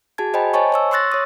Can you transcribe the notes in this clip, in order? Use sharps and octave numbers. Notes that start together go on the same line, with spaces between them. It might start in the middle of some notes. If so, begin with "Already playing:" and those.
F#4 G#4 A5 G#6
C5 D#5 G5 G#5 B5
C5 C#5 D#5 G#5 A5 C#6
C#5 C#6 E6
C6 C#6 E6 F#6 A6 A#6
C#5 D#6